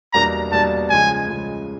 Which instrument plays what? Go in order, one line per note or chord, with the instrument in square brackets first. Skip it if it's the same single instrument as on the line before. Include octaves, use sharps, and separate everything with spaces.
[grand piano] E2 B2 G3 A#3 D4 [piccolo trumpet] A#5
[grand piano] E2 B2 G3 A#3 D4 [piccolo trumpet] A5
[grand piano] C#2 C#3 F3 G#3 [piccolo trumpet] G#5
[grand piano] C#2 C#3 F3 G#3